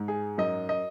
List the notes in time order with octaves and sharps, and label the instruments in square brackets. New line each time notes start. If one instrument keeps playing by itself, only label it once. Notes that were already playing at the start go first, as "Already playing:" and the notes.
Already playing: [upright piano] G#2
G#4
F#2 D#5
D#5